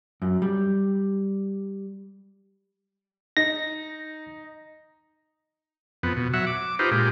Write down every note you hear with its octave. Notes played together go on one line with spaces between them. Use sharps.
F#2
G3
D#4 A#6
F2 B3
B2
F#3 E5 F#5
D6
D#4 F4 G4 B4 C5
A#2 G#3 G4